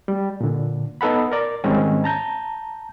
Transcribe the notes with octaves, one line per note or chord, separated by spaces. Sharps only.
G3
A#2 D3
B3 D#4 A4 F#5 B5
A#4 D5
G#2 D#3 G3 G#3 C4 C#4
A5 A#5 G6